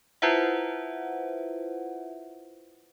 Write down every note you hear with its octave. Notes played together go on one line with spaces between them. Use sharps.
E4 F4 B4 C5 E5 F#5